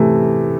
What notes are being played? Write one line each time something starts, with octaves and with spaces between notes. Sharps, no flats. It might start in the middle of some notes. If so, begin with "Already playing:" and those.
Already playing: C3 E3 A3